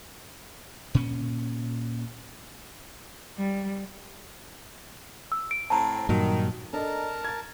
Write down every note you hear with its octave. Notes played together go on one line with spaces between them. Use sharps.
A#2 C#4
G3
E6
D7
A2 C4 A5 A#5
G2 A#2 D#3 F#3
D4 A4 A#4 D#5 A5 A#5
G#6 A6